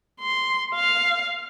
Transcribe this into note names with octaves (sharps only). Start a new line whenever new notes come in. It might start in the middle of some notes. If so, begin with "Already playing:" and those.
C6
F5